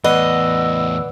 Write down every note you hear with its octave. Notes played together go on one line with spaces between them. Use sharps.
E2 A2 B4 D5 D#5 F#5 E6